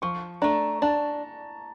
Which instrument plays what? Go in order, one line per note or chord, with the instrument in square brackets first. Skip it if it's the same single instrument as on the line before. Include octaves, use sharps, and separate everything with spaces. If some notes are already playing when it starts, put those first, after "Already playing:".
[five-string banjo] F3 [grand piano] C#6
[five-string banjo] A3 D4 [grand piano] A#5
[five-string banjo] D4 [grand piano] A5